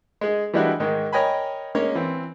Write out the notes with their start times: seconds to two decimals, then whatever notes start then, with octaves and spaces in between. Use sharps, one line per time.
0.21 G#3 G#4
0.53 E3 G3 G#3 D4 E4 F#4
0.80 G#2 D#3 G#3
1.12 A#4 C#5 D#5 G5 G#5 B5
1.75 G#3 A#3 C#4 C#5
1.95 E3 C4